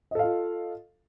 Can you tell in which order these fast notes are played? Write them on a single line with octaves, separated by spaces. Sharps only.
D#5 A4 F5 F4